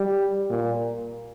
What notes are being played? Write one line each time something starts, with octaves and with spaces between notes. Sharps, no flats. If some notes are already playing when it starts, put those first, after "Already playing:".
Already playing: G3
A#2